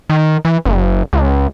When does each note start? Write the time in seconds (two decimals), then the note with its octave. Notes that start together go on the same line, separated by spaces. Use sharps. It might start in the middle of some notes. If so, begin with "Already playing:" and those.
0.10 D#3
0.45 E3
0.65 F#1
1.13 C#2